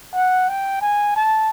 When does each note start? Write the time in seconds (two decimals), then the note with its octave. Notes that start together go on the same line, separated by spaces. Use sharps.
0.15 F#5
0.49 G5
0.81 G#5
1.16 A5